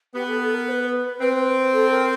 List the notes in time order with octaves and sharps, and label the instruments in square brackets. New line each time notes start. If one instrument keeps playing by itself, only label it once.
[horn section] B3 [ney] G4
[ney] A4
A4
A#4
C5
B4
[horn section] C4
[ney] A4
A#4